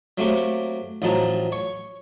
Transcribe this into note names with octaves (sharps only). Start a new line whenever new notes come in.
F#3 A3 A#3 C4 G4 C#6
A1 F3 F#3 D#4 A5 A#5
C#5 C#6